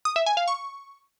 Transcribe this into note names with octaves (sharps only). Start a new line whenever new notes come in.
D#6
E5
G#5
F5
C#6